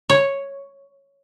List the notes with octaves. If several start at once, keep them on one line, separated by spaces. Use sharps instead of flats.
C#5